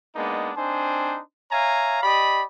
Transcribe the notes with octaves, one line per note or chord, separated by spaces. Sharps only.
G#3 A#3 B3 D4 D#4
C4 D4 D#4 C5 G#5
C#5 E5 F5 G#5 A#5
G4 D5 D#5 B5